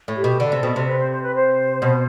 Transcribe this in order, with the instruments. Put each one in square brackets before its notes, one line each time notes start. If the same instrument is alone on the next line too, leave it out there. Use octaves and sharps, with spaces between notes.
[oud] A2
[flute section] G4
[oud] B2
[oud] D3 [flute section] A4
[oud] C3
B2
C3
[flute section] B4
C5
C5
B4
C5
[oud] B2